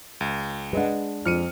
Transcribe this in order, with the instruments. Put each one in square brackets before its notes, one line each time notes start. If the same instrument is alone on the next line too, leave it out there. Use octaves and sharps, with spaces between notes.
[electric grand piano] C#2
[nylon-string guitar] G#3 D4 [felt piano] B4 D#5 F#5
[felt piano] F2 [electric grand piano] F6 C#7 D#7